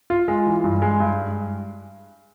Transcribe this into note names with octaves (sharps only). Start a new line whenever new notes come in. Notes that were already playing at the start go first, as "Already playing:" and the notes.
F4
G#3
E3
G2
G#3
G2